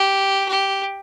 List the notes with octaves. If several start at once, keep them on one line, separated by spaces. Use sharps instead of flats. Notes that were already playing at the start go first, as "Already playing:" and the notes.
Already playing: G4
G4